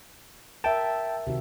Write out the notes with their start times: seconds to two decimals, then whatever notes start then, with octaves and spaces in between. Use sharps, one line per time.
0.64 A#4 E5 G5 A5
1.27 C3 D#3 F#4